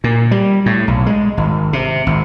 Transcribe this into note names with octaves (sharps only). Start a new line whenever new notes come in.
A#2
G3
A2
B1
G#3
G#1
C3
G#1